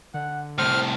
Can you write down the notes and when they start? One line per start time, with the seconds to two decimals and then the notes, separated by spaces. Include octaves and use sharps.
0.14 D3 F#5
0.58 C2 A2 C5 F6